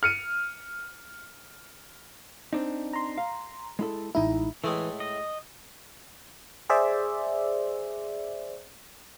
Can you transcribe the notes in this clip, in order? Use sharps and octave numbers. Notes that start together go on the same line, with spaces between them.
F6 C#7 D#7
C4 D4 D#4
A#5 C6
F5
G#3 E4 A4
A1 G#3 D#4 E4
A2 E3 G#3 A3
D#5
G#4 C5 D5 E5